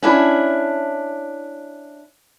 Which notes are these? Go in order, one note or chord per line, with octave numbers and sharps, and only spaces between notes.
C#4 D4 E4